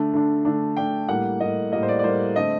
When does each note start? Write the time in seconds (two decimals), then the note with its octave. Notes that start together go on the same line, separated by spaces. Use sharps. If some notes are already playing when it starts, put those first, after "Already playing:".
Already playing: D3 A3 D4
0.13 D3 A3 D4
0.45 D3 A3 D4
0.77 D3 A3 D4 G5
1.09 A2 G3 A#3 F#5
1.40 A2 G3 A#3 D#5
1.72 A2 G3 A#3 D#5
1.83 C5
1.88 D5
1.99 D5
2.04 A2 G3 A#3 C5
2.36 D3 A3 C4 D#5